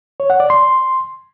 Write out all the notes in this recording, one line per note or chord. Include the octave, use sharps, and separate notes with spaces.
C#5
F#5
D5
C6